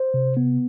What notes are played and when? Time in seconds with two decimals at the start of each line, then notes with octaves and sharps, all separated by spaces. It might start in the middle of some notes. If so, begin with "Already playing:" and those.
Already playing: C5
0.14 C3
0.37 B3